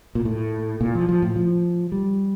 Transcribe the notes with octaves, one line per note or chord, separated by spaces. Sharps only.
A#2
A2
A#2
F3
F3
A2
F3
G3